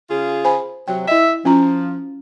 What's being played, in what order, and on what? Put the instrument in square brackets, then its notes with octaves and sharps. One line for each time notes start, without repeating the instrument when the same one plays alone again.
[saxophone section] C#3 F4 G#4
[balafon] C5 G#5 B5
[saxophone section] C3 F#3 [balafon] G5
[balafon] E4 D#5 [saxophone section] E5
[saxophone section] F3 [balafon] C#4 F4 A#5